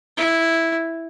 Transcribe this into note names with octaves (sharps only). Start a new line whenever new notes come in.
E4